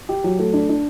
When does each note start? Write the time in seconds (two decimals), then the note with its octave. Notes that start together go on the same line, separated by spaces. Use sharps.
0.09 G4
0.24 F#3
0.39 A3
0.54 D4
0.69 D4